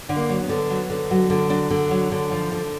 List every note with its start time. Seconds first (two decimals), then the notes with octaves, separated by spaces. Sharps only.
0.09 D3
0.16 A#3
0.29 F#3
0.43 B3
0.49 D3
0.70 F#3
0.90 D3
1.11 F#3
1.30 D3
1.50 F#3 D4
1.70 D3
1.91 F#3
2.12 D3
2.32 F3
2.52 D3